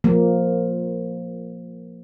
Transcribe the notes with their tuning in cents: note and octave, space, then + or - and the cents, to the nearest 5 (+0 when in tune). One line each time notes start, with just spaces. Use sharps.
F3 +15 A#3 +0